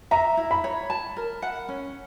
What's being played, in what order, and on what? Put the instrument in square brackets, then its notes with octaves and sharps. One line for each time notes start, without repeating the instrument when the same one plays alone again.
[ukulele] E5 [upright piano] A#5
[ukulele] E4
[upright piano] B5
[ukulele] C#5
A5
A#4
F#5
C#4